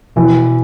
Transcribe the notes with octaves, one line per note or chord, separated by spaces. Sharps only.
B2 E3